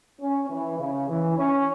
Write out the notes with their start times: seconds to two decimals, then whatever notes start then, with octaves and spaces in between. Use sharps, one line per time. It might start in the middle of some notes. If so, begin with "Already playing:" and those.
0.21 C#4
0.49 E3
0.79 C#3
1.08 E3
1.37 C#4